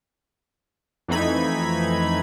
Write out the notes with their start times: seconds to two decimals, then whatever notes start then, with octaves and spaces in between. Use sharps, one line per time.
1.08 F2 E3 A3 D#4 B5 G#6